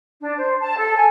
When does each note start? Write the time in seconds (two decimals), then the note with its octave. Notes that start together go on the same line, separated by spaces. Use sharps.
0.20 D4
0.37 C5
0.61 A5
0.77 A4
0.96 G#5